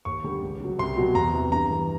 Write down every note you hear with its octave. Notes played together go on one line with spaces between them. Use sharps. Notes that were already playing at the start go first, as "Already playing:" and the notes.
D#2 C#6
D3 G3
C#2
C#3 F#3
C2 C6
B2 F#3
E2 A#5
C3 E3
G2 A#5
E3 G3